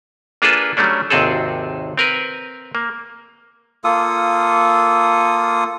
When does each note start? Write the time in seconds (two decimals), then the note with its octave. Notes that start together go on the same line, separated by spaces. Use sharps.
0.42 A#3 D4 F4 G#4 A4 B4
0.77 F#3 G3 A3 C#4 D4
1.10 G#1 D#2 C3 C4 G#4 A4
1.98 C4 A#4 B4
2.75 A#3
3.84 A#3 F4 A4 D#6